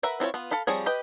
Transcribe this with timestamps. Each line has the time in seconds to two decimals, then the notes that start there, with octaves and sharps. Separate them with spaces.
0.03 A#4 B4 E5 F#5 B5
0.20 C4 E4 F4 C#5
0.34 B3 F4
0.51 A4 F5 B5
0.67 F3 G3 C4 G#4 C#5
0.86 G4 B4 D#5 G5